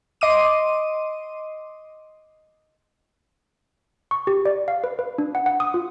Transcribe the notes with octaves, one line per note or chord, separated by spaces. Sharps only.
D#5 C6 D6 D#7
C#6
G4
D5
F5
B4
B4
D4
F#5
F#5
D#6
F4